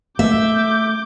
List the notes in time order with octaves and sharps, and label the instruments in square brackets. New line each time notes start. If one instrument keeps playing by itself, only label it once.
[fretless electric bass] A3 [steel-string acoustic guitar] E5 [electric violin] D6 G6